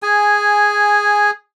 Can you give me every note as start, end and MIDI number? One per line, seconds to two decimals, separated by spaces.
0.03 1.31 68
0.03 1.31 80